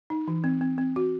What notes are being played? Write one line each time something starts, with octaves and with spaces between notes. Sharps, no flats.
D#4
E3
C4
C4
C4
F#4